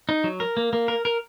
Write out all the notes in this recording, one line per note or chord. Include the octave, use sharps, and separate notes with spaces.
D#4
F#3
A#4
A#3
A#3
A#4
A#4